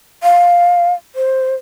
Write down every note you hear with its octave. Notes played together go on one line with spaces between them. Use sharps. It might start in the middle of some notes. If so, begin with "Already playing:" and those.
F5
C5